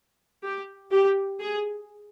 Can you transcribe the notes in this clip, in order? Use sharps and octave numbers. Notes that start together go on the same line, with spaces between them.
G4
G4
G#4